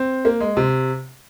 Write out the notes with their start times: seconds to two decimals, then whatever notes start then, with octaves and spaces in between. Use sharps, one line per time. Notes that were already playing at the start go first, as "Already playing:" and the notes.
Already playing: C4
0.25 A#3
0.40 G#3
0.57 C3